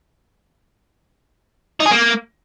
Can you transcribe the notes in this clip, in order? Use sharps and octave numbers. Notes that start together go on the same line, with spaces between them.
D#4
G#4
A#3